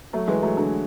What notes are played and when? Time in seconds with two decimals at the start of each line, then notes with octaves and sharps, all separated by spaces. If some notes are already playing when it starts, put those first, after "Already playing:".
0.13 F#3 A3
0.28 E3 G#3
0.42 F#3 A3
0.57 D3 F#3